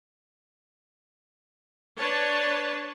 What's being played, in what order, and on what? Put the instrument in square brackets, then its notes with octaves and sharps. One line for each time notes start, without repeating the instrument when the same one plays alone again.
[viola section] D4 B4 C#5 A5